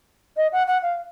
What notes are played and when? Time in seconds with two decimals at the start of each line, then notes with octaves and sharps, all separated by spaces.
0.37 D#5
0.52 F#5
0.67 F#5
0.82 F5